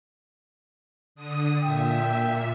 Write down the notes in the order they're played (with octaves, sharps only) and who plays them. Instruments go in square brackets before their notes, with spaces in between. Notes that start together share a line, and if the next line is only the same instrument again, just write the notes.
[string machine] D3 D#6
[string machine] A#2 E5 [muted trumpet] G5